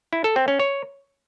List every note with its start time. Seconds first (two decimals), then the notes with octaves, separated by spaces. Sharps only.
0.13 E4
0.24 A4
0.36 C4
0.48 C#4
0.60 C#5